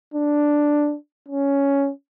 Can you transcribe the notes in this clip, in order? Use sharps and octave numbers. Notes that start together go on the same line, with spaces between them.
D4
C#4